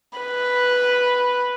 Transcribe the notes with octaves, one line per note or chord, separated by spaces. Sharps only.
B4